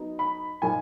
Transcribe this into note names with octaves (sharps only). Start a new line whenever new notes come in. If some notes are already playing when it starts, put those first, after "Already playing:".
Already playing: F#3 B3 D#4
B5
A#2 F3 A#3 D#4 G#5